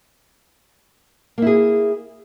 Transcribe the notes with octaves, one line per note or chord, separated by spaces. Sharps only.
A#3 E4 G#4